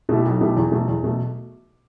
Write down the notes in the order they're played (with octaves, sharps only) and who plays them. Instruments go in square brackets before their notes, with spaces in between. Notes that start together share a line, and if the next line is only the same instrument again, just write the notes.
[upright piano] B2 A3 E4 G4
B1
B2 A3 E4 G4
E2
B2 A3
E2
B2 A3